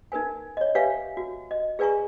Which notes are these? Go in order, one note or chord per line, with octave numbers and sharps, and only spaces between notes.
D#4 A#4 B4 G#5
C#5 D#5
G4 B4 C#5 E5 F5 G#5
F#4
D#5
G#4 B4 D5 G#5 A#5 C#6